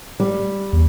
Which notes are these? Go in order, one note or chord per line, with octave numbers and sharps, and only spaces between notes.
G3
E2